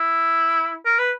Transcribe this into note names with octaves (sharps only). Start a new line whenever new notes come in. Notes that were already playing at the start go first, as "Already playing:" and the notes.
Already playing: E4
A#4
B4